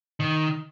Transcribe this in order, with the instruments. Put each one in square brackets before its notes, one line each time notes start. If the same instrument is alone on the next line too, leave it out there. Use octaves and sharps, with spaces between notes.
[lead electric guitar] D#3